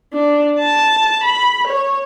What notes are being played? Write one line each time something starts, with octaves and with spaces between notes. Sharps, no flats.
D4
A5
B5
C#5